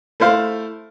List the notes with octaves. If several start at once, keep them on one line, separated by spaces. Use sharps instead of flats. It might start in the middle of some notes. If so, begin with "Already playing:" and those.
A3 E4 C5 F5